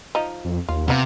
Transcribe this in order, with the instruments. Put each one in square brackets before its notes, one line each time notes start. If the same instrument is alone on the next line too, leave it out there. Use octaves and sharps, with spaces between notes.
[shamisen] F3 D#4
[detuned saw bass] F2
[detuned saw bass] D#2 [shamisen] F4
[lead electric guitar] C3 [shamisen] B3 D#4 F4